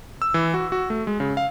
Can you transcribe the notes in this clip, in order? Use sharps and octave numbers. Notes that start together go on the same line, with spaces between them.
E6
E3
F#4
F#4
A3
G#3
C#3
F5